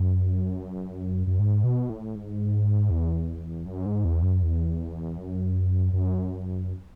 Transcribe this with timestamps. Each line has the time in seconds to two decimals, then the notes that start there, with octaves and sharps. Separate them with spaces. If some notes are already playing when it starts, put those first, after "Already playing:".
Already playing: F#2
1.27 F#2
1.39 G#2
1.64 B2
1.90 A2
2.15 G#2
2.91 E2
3.66 F#2
3.86 G#2
4.05 E2
4.23 F#2
4.43 E2
5.18 F#2
5.93 F#2